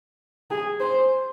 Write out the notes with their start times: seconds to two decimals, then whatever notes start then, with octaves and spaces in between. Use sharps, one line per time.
0.51 G#4
0.80 C5